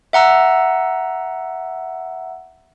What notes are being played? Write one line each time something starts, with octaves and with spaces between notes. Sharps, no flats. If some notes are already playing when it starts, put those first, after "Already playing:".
E5 F#5 A#5 E6